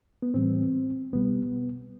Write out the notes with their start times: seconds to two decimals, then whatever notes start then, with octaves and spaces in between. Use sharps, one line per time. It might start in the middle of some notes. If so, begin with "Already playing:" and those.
0.22 B3
0.34 A2 E3 G3 C4
1.13 C2 B2 G3 B3